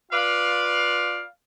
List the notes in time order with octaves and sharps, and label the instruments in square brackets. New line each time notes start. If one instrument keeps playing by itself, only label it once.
[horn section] F4 B4 D5 F5